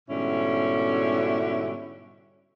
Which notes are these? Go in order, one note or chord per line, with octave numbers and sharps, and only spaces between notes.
G#2 B2 D3 G3 C#4 E4